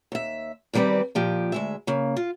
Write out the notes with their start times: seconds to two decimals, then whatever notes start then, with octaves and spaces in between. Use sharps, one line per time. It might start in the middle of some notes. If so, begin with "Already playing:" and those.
0.12 D#2 E5
0.73 E2 D#3 G3 C4 B4 D5
1.15 A#2 F3 G4
1.52 D2 G#3 E5
1.87 C#3 A#3
2.17 F4